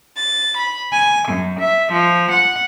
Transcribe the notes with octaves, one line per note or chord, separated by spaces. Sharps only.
A6
B5
G#5
F#2
E5
F3
F#5